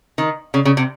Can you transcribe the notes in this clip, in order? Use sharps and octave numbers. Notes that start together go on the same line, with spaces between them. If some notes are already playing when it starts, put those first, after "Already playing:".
D#3
C#3
C#3
C3